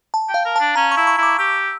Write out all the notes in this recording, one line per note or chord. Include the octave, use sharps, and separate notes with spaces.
A5
G5
F5
A#4
D4 A5
C#4 A#5
C#6
E4
C#6
E4 D6
G4 E6